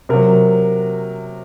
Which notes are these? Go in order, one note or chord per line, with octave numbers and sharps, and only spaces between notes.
C3 F#3 A#4